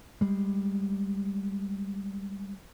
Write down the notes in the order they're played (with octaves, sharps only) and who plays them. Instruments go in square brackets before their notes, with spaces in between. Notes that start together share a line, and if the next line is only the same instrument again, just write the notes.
[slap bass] G3 G#3